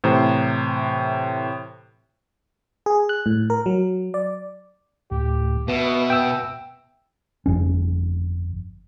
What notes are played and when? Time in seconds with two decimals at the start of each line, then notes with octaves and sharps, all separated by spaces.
0.04 A2 C3 E3 C5 A#5
2.86 G#4
3.09 F#6
3.26 A2
3.50 A#4
3.66 F#3
4.14 D5
5.11 D2 A2 G4
5.68 B2 B3 B4 E5
6.10 G5 E6
7.46 G1 F2 C#4